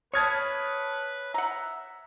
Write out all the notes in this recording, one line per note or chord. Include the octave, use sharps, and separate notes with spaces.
B4 C#5 A5 D#6 F6 G#6
E5 F#5 A#5